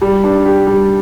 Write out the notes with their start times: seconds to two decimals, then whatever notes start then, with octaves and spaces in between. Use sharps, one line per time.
0.01 G3
0.24 D4
0.45 G4
0.67 G3